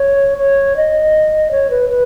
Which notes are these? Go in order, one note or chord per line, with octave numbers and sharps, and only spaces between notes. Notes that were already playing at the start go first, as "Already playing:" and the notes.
Already playing: C#5
C#5
D#5
C#5
B4
B4